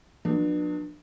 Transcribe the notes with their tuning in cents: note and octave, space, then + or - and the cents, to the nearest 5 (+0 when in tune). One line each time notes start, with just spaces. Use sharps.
F#3 -45 B3 -30 D4 +30